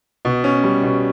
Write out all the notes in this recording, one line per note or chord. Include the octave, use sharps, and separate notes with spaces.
B2
C#4
G3
B2